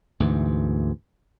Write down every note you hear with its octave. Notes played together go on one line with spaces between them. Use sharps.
D2 G#2 E3